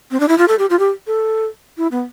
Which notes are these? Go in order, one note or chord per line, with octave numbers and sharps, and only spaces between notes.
C4
D4
E4
F4
A4
G4
F4
G4
A4
E4
B3